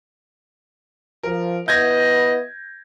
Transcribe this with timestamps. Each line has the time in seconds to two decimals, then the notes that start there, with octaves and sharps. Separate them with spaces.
1.23 F3 A#4
1.68 B3 E4 D#5 G6 G#6 A#6